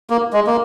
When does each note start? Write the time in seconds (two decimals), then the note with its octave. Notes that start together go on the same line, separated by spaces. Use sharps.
0.10 A#3
0.33 G#3
0.47 A#3